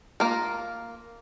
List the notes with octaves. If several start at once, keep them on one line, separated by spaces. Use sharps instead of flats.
A#3 F4 A#4